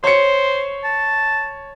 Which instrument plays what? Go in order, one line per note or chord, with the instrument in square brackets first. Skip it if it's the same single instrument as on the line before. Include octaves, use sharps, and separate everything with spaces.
[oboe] C5 [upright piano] C#5 C#7
[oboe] A5